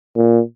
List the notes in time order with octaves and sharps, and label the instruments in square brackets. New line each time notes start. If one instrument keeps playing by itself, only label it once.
[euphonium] A#2